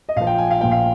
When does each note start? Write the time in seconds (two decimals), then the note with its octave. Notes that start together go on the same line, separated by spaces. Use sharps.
0.09 D#5
0.16 A#1 A#2 F3 F5
0.27 G5
0.38 G#5
0.51 F5
0.60 A#1 A#2 F3 G5
0.72 F5